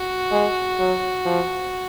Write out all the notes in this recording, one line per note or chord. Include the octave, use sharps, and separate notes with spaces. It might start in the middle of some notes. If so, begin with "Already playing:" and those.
Already playing: F#4
G#3
F#3
F3